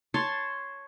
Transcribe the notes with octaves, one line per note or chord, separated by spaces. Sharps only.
C#5 A5 C6